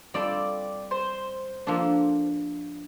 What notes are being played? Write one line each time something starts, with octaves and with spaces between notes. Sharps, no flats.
G3 C4 F4 A4 D5
C5
F3 A#3 D4 A4